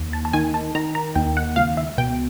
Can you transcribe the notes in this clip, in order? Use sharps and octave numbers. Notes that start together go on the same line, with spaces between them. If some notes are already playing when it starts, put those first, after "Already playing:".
Already playing: D#2
A5
A5
D#3 G#5
A5
D#3 A#5
A#5
D#2 G5
F#5
C#2 F5
E5
B2 G5